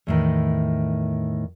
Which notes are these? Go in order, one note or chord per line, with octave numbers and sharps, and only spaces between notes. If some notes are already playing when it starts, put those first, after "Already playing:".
E2 A2 D#3